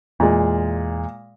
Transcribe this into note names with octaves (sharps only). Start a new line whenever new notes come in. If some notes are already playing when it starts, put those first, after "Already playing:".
E2 A#2 G#3